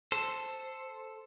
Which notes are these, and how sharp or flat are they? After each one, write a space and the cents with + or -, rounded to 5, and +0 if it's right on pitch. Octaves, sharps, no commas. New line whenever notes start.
A4 +0 C5 +0